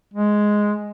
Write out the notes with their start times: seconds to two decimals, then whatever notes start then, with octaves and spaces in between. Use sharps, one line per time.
0.14 G#3